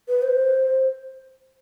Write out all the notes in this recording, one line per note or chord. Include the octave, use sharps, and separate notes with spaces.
B4
C5